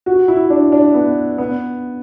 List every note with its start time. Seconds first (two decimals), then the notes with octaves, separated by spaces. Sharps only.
0.06 F#4
0.28 E4
0.50 D4
0.72 D4
0.94 B3
1.38 B3